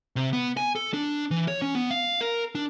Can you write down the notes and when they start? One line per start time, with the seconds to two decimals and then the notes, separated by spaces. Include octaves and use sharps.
0.16 C3
0.33 B3
0.57 G#5
0.75 A4
0.94 D4
1.31 E3
1.48 C#5
1.62 C#4
1.75 B3
1.91 F5
2.21 A#4
2.55 D4